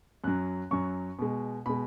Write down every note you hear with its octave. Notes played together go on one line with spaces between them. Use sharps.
F#2 F#3 F#6
F#2 F#3 C#6
B2 G#3
B2 G#3 B5